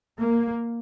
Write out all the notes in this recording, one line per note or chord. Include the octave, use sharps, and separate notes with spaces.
A#3